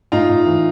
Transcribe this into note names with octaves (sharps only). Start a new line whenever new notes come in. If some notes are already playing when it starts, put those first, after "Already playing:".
A2 D#4 F4
A2
E3